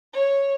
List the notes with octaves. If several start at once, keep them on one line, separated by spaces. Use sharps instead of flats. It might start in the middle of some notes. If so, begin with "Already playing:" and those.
C#5